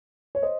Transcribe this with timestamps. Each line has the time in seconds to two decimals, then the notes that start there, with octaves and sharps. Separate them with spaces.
0.35 C#5
0.43 C5 D#5